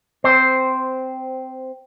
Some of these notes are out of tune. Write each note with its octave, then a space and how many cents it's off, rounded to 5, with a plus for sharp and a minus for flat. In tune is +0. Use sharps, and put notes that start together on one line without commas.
C4 -10 C5 +0